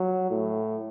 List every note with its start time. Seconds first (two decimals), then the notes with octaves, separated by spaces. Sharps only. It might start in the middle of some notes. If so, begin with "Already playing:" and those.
Already playing: F#3
0.30 A2